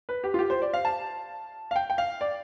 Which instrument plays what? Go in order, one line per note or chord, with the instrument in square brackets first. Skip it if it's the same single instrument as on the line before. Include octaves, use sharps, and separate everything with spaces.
[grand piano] B4
G4
F4
G4
C5
D5
F5
A5
F5
G5
G5
F5
D5